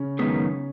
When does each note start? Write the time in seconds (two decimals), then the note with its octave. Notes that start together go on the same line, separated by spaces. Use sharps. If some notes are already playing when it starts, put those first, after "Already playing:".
Already playing: C#3 C#4
0.19 F#2 D#3 G#3 B3